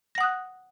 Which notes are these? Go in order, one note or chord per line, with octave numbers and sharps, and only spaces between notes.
F#5 D#6 F#6 A#6